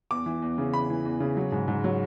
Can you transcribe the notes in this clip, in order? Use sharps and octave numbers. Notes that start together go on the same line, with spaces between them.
E2 D6
E3
E2
C#3
E2 B5
E3
E2
C#3
F#3
G#2
G#2
F#3